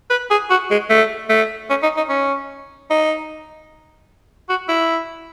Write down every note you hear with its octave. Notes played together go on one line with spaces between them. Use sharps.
B4
G#4
F#4
G#3
A3
A3
C#4
D#4
D#4
C#4
D#4
F#4
E4